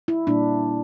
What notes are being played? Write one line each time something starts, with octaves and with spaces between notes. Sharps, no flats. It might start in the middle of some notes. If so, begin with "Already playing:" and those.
E4
A#2 G3 A#3 D4